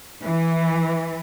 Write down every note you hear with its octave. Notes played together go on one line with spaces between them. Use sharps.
E3